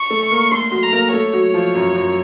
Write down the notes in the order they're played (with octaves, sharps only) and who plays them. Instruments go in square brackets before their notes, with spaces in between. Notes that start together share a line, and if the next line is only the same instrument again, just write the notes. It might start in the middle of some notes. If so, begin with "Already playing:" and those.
Already playing: [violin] C#6
[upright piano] A3 A4
A#3 A#4
[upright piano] A3 A4 [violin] C6
[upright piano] F#3 F#4
[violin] A#5
[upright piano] A#3 A#4
[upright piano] A3 A4 [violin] C#5
[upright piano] F#3 F#4
F3 F4
F#2 F#3
F#2 F#3
F#3